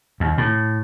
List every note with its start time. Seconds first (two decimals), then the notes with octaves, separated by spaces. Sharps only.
0.20 D#2
0.38 A2